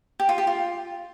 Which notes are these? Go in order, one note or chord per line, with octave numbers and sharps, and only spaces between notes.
G4
F4
G4
F4